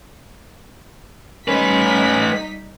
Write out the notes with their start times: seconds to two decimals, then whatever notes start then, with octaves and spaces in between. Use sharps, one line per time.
1.48 G3 A3 C#4 D#4 B4 B6